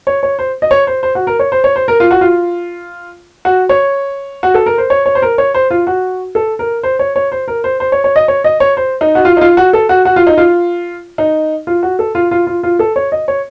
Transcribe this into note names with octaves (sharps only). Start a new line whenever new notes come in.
C#5
C#5
C5
D#5
C#5
C5
C5
F#4
A#4
C#5
C5
C#5
C5
A#4
F4
F#4
F4
F#4
C#5
F#4
A4
A#4
C5
C#5
C#5
C5
A#4
C#5
C5
F4
F#4
A4
A#4
C5
C#5
C#5
C5
A#4
C5
C5
C#5
C#5
D#5
C#5
D#5
C#5
C5
D#4
F#4
F4
D#4
F4
F#4
A4
F#4
F#4
F4
D#4
F4
D#4
F4
F#4
A4
F4
F4
F4
F4
A4
C#5
D#5
C#5